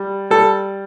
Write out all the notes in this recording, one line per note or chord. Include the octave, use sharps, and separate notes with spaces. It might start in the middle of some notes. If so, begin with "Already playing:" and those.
Already playing: G3
G3 A4